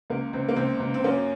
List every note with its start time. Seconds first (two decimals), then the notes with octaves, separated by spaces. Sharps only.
0.10 C#2 A#3
0.33 C#2 C4
0.49 A#3
0.56 C#2 C4
0.80 C#2
0.94 C4
1.04 F#2 A#3 C#4